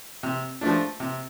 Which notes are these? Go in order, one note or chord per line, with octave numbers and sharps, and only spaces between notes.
C3
F3 A3 D4
C3